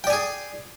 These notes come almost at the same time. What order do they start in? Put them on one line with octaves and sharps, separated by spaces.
G5 D5 G#5 G#4